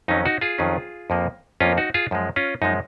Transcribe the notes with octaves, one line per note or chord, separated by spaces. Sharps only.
F2 D#3 F#3 C#4 D#4
D#4 F#4
F4 G#4
F2 D#3 F#3 C#4
F2 F3 A#3
F2 F3 A#3 C#4 F4
D#4 F#4
F4 G#4
F#2 F3 G#3
C#4 F4
F#2 F3 G#3 D#4